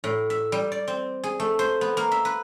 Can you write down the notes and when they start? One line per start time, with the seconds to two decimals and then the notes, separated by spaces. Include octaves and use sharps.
0.04 A2
0.30 E5
0.52 G3
0.72 D5
0.88 C4
1.24 G#4
1.40 A3
1.59 C5
1.81 B3
1.97 A#3
2.12 E5
2.25 B4